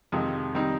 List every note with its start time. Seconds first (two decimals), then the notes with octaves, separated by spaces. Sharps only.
0.12 F2 C3 D#3 G#3
0.55 D#3 G3 C4 D#4